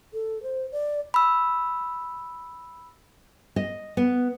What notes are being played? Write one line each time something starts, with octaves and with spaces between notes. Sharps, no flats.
A4
C5
D5
B5 E6
D#5
B3